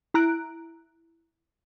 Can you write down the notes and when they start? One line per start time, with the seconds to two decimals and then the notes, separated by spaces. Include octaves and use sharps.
0.14 E4 A#5 F#6 D7